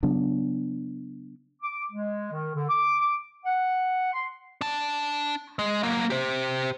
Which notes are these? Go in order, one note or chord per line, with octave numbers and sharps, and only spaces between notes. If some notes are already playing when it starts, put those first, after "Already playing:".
C#3 F#3 B3 D4
D6
G#3
D#3
D3
D6
F#5
C6
D4 A5
G#3
F#3 A#3
G4 C5